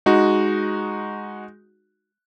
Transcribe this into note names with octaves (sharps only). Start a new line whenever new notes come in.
G#3 D#4 F#4